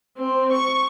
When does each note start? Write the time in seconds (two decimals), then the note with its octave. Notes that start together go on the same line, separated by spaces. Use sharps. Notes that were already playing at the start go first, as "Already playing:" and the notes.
0.17 C4
0.52 C#6